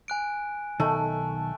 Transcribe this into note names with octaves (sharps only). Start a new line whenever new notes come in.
G#5 F#6 D7
B1 D#3 A3 A5